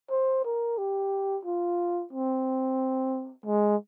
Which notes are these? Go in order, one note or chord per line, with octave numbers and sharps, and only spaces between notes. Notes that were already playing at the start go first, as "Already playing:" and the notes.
C5
A#4
G4
F4
C4
G#3